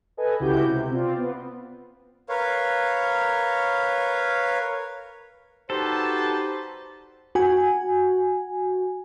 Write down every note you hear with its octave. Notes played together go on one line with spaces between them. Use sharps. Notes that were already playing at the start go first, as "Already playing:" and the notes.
A4 B4 D#5 G#5
C#2 E4 F#4 G4 G6
C3
C4 F4 D5
B3
A#4 B4 C#5 F5
G3 D#4 F#4 G4 A4 B4 C5 A5
F#4 G#5